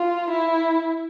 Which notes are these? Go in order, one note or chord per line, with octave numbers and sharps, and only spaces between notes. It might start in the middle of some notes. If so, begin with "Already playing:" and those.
Already playing: F4
E4